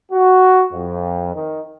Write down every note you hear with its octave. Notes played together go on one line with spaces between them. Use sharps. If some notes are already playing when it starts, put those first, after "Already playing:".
F#4
F2
D#3